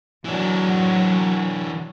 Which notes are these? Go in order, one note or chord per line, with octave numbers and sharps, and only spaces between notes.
E3 F#3 D4